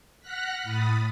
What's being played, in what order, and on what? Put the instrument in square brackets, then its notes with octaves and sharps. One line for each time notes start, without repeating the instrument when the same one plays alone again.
[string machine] F#5 F6 F#6 A#6 B6
A2 B5 D#6 A6